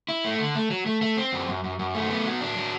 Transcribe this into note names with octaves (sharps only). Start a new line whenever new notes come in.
E4
A3
D3
A3
F#3
A3
A3
C4
F#2
F#2
F#2
F#2
A3
B3
F#3
D4
F#3